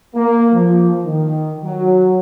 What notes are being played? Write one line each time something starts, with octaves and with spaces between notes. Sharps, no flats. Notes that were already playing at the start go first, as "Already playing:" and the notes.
A#3
F3
D#3
F#3